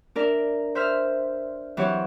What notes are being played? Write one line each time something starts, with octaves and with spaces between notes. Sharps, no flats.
D4 A#4 D5 E5
C5 E5 C6 F6
E3 F#3 C4 G4 C#5